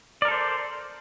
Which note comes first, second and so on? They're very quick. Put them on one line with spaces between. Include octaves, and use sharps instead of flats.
D5 A#4 A4 C5